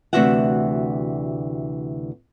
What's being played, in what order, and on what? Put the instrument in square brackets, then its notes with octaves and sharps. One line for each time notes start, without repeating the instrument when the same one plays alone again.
[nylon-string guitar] D2 C3 E3 F#4 E5 F#5